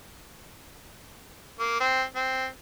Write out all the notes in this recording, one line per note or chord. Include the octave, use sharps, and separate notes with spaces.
A#3
C4
C4